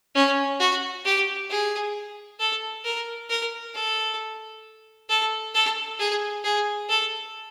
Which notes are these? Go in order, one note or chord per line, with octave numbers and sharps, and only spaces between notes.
C#4
F#4
G4
G#4
A4
A#4
A#4
A4
A4
A4
G#4
G#4
A4